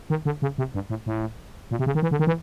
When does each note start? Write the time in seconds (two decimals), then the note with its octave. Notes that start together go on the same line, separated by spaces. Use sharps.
0.10 D#3
0.25 D3
0.42 C#3
0.58 C3
0.74 G2
0.90 A2
1.06 A2
1.71 A#2
1.79 C3
1.86 C#3
1.95 D#3
2.02 E3
2.11 D3
2.19 D#3
2.27 E3